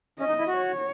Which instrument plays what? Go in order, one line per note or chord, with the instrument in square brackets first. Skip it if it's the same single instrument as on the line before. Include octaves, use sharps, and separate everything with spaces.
[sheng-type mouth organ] C#4 [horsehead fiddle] D#5
[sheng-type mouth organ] D#4
E4
F#4
[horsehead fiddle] C#5